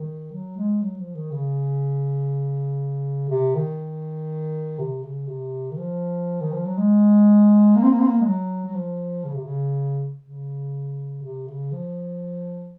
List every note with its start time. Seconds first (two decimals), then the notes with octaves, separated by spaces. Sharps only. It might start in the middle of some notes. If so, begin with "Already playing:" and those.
Already playing: D#3
0.32 F#3
0.57 G#3
0.82 F#3
0.98 F3
1.15 D#3
1.31 C#3
3.29 C3
3.55 D#3
4.79 C3
5.03 C#3
5.28 C3
5.71 D#3
5.77 F3
6.41 D#3
6.53 F3
6.65 F#3
6.77 G#3
7.76 A#3
7.83 C4
7.91 A#3
7.99 C4
8.06 A#3
8.21 G#3
8.25 F#3
8.65 F#3
8.75 F3
9.25 C#3
9.35 C3
9.44 C#3
10.24 C#3
11.22 C3
11.48 C#3
11.72 F3